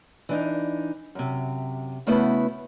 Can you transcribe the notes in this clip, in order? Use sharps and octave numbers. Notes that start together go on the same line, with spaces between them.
E3 D4 D#4
F#2 C3
C#3 A3 B3 E4 F#4 B4